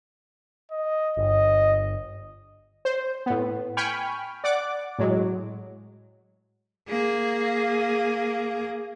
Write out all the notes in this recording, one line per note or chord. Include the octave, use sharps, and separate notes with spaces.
D#5
G1 D#5
C5
A2 B3
G5 G#5 B5 C#6 F6
D5 F#5 D6
A2 F#3 G#3
A#3 G#4